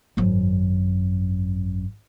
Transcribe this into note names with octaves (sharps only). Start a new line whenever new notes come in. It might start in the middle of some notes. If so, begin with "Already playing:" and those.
G#1 F#2